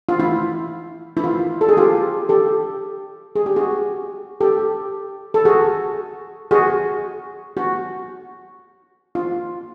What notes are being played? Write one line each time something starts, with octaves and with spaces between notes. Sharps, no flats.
F4
E4
E4
F4
A4
G#4
F4 G4
G4 A4
G#4
G4
F#4 G#4
G4 A4
A4
F#4 G#4
F#4 G#4
F#4
F4